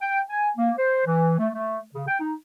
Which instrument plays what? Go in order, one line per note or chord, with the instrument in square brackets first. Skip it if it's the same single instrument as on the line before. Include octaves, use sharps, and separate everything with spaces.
[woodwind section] G5
G#5
A#3
C5
E3
A3
A3
C#3
G5
D#4